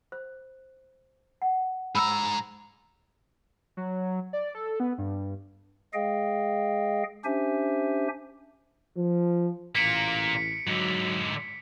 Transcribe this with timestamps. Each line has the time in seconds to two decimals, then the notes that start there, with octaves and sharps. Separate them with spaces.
0.12 C5
1.42 F#5
1.95 G#2 A#5 B5 E6
3.77 F#3
4.33 D5
4.55 A4
4.80 B3
4.98 G2
5.93 G#3 G#4 D#5 F5 G5
7.25 C#4 D4 G4 C5 E5 G#5
8.97 F3
9.75 A1 A#2 A#3 B6 C#7 D7
10.67 G#2 D3 F#3